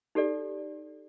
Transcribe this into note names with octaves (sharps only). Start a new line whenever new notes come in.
D#4 G4 A4 D5